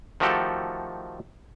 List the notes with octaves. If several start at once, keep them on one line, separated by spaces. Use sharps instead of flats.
D#3 F3 A3 F#4 G4 A4